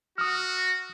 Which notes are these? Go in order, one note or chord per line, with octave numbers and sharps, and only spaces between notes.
F#4 D#6 F6